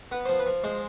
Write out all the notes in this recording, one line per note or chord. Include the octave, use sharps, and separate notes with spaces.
B3 B4
F3 C5
B4
F3
G#3 C5